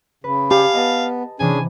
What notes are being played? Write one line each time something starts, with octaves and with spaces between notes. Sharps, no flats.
C#3 B4
G4 F5 G#5 A5
B3 D#5 A5
C3 E3 C#4 D4 G#4 G#5